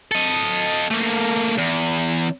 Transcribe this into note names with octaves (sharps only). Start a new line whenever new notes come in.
A4 D#5
A3 A#3
E2